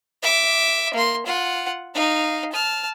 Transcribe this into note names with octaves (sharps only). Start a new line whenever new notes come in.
E5 D6
A#3 C6
F4 F#5
D#4 F5
A5 F6